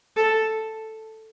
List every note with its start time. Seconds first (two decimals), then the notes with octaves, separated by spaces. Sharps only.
0.16 A4